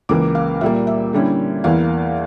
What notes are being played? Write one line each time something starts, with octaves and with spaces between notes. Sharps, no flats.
C#2 C#3 E3 A#3 D6
F5
A#2 G3 A#3 E5
E5
D3 G3 A#3 C#4 E4
E2 E3 A#3 E4 F5